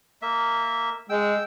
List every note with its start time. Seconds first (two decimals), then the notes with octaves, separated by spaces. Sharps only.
0.22 A#3 E5
1.09 G#3 G5 E6